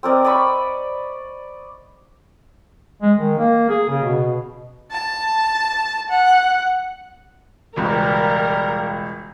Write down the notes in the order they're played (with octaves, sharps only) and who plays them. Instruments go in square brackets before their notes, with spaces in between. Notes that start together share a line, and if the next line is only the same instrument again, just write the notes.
[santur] C4 A#4 D5 D#5
D5 D#5 B5 C#6
[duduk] G#3
D#3
A#3
G#4
C#3
B2
[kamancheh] A5
F#5
[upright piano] E1 C#2 [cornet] G3 [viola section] A#4